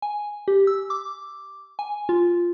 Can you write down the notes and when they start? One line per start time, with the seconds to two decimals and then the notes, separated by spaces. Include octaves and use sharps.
0.02 G#5
0.48 G4
0.67 E6
0.90 D6
1.79 G#5
2.09 F4